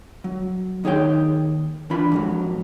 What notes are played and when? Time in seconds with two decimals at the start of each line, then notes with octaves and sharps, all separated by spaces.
0.24 F#3
0.84 D#2 D#4 G#4 C#5 G5
1.90 E3 D4 F4 B5
2.12 F2 G#2 F#3